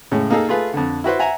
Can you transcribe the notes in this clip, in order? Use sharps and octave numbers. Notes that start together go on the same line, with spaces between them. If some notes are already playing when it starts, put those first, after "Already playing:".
A2 C#3 G#3
A#3 D#4 G#4 A4
A3 F4 G#4 B4
F2 D3
E4 F#4 B4 C5
E5 F#5 G#5 A#5